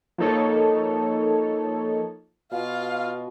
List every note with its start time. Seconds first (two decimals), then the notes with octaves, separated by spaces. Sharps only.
0.18 F3 A#3 D#4 A4 C#5
2.52 B2 F4 F5